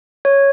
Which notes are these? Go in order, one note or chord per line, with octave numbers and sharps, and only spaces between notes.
C#5